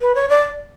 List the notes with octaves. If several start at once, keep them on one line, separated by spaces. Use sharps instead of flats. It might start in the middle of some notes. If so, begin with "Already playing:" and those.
B4
C#5
D5